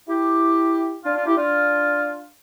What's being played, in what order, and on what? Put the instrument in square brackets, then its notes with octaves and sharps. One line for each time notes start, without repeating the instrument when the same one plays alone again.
[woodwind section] E4 G4
D4 F4
D4 F4
E4 G4
D4 F4